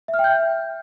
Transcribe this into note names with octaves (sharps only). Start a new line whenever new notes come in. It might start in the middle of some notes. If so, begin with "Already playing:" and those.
E5
F6
G5
G6
E5